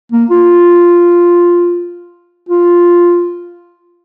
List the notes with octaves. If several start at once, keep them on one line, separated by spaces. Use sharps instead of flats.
A#3
F4
F4